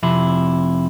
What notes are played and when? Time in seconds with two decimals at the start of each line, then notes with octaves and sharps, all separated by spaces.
0.03 F2 C3 E4